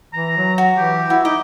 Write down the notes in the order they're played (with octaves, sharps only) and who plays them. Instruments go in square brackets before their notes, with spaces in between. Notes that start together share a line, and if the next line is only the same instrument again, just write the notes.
[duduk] E3 [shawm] A#5
[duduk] F#3
[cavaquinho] F#4
[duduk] E3 [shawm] G4
[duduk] E4 [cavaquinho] F#4
[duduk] D#4 [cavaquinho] D#5 [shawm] D6